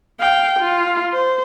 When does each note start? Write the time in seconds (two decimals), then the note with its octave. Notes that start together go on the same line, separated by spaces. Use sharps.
0.20 F5 G5
0.59 F4
1.13 C5